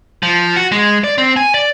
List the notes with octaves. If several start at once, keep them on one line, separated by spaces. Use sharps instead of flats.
F3
F#4
G#3
D5
C4
G#5
D5